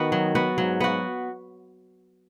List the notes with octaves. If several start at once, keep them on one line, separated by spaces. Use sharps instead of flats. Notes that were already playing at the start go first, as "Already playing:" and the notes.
Already playing: D#3 B3 F#4
F#3
B3 F#4
G#2 F#3
B3 F#4